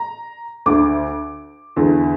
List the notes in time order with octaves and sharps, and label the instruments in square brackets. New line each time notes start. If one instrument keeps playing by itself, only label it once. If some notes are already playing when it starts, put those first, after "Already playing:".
Already playing: [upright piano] A#5
D2 D3 D6
E2 D3